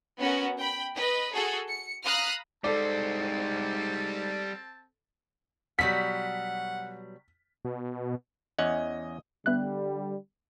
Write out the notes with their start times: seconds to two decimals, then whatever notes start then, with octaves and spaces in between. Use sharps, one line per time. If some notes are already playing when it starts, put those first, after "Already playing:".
0.20 B3 C#4 F#4 A#4
0.59 G5 B5
0.95 B4 D#5
1.34 F#4 G#4 A4
1.69 C#7
2.05 F5 A#5 B5 D#6 F6 F#6
2.64 G#2 G3 C4 A4 C5 D5 A5
5.79 B2 F#3 G3 F#5 B6
7.65 B2
8.58 E2 C#4 D#5 F#5
9.46 D3 G3 B3 E5 F#6